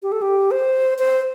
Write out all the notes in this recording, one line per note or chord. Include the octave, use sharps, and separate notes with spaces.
G4
A4
G4
C5
C5